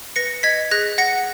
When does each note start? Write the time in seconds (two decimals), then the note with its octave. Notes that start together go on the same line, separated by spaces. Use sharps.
0.16 B4 A#6 C#7
0.43 D#5 G#6 B6
0.71 G#4 F#6 A#6
0.98 F#5 A#6 C#7